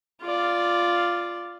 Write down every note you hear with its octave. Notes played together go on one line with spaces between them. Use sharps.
F4 D5